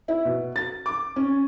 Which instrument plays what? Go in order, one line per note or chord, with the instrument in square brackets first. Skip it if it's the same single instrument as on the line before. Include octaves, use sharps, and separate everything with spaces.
[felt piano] E4
B2
A6
D6
C#4